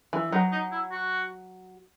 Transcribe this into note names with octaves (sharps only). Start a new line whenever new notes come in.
E3
F#3 D#4
D#4
E4
F#4